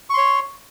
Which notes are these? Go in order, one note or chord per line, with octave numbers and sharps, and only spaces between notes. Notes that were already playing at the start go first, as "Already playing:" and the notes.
C#5 C6 C#6